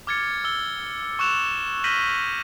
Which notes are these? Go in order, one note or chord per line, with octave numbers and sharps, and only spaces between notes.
D6 F6 G#6 A6 C#7
E6 G7
C#6 E6 F#6 E7 F7
F6 G6 A#6 B6 D#7 F#7